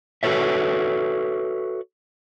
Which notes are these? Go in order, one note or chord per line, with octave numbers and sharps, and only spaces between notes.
F#4 A4 B4 C#5 E5